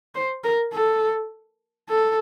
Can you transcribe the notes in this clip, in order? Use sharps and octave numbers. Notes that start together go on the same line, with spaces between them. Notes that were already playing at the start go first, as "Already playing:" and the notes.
C5
A#4
A4
A4